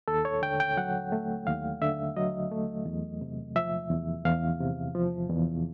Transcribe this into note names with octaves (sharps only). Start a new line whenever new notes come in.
D#2 A4
C#5
D3 G5
G5
F#3 F#5
A3
D#2 F5
D3 E5
F#3 D#5
A3
E2
C3
F3 E5
E2
E2 F5
C3
F3
E2